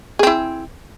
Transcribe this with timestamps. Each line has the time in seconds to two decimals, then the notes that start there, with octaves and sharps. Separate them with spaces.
0.19 G#4
0.23 C4
0.27 E4